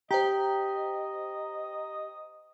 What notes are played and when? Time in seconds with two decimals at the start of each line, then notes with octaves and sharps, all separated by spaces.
0.11 G4 C5 D#5 G5 A#5